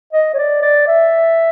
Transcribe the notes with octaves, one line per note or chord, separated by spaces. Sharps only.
D#5
C#5
D5
D5
E5